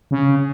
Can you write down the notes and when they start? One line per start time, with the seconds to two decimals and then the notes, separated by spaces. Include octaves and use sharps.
0.11 C#3